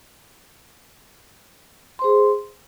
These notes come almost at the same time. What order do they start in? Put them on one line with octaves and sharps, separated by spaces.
C6 C5 G#4